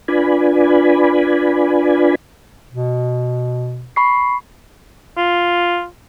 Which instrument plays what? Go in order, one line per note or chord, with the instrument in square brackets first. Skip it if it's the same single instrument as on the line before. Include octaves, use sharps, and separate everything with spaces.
[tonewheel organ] D4 F4 B4 D5 G#5 B5
[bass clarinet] B2
[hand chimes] B5 C#6 C7
[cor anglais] F4